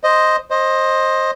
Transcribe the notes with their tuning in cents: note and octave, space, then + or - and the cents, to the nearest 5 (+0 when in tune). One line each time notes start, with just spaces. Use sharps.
C5 +0 D#5 +0
C5 +20 D#5 +0